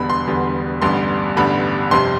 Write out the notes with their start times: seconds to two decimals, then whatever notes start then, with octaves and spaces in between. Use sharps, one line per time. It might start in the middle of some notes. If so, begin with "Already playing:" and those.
Already playing: E1 E2 D3 G3 B3 B5
0.10 C6
0.27 E1 E2 D3 G3 B3
0.82 A1 G2 D3 G3 B3 C6
1.36 A1 G2 D3 G3 B3 B5
1.91 G1 F2 C3 G3 C6